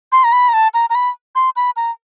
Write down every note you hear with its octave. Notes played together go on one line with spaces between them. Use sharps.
C6
A#5
B5
A#5
A5
A#5
A#5
B5
C6
B5
A#5